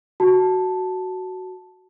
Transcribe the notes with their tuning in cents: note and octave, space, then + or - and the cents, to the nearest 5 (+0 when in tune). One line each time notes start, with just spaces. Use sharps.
F#4 +5 A5 +0